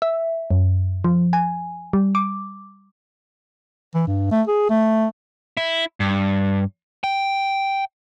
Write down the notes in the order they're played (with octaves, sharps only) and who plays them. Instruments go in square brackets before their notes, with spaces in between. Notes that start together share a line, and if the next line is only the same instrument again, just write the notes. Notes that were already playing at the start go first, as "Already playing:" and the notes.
[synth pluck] E5
F#2
F3
G#5
G3
D6
[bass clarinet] E3
G2
A3
G#4
A3
[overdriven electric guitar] E4
G2
G5